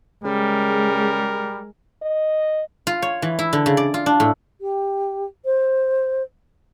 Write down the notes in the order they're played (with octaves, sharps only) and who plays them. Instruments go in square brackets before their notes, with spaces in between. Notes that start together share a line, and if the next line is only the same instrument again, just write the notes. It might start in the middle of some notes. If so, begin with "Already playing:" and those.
[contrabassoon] C#3 [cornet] G3 [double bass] G#3 [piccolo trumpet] A#4
[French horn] D#5
[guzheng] F4
C#5
E3
E4
D3
C#3
D5
F4
D4
A2
[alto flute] G4
C5